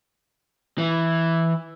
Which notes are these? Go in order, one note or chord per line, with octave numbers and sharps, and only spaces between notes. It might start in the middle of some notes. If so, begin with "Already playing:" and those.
E3